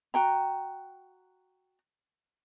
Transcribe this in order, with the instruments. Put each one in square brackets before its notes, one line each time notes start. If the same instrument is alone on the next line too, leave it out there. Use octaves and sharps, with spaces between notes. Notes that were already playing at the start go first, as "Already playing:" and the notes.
[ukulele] F#4 G5 A#5